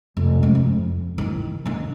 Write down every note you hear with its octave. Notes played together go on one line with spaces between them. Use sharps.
F1
F#2 G#3
F2
D#3 E4
D#3 D4